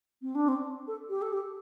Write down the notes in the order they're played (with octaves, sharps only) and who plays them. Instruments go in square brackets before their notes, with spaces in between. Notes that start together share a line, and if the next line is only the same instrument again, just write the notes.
[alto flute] C4
D4
C4
A4
G4
A4
G4